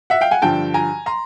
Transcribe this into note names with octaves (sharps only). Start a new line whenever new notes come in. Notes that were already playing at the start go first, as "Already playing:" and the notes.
E5 F#5
F5 G5
F#5 G#5
G2 D3 F3 G5 A5
G#5 A#5
A#5 C6